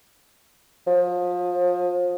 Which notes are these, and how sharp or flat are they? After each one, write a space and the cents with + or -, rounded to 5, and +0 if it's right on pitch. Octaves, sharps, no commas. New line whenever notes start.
F3 +30